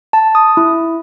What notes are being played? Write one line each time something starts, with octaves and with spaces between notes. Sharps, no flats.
A5
D#6
E4